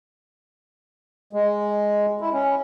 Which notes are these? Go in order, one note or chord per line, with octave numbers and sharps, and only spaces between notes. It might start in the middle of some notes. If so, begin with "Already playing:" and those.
G#3
E4
C#4